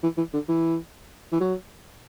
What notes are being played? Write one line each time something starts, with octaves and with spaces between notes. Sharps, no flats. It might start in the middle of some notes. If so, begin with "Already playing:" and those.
E3
E3
D3
E3
E3
F#3